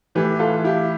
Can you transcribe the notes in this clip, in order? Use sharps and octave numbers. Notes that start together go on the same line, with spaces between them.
A2 E3 G4 B4
F4 A4
E4 G4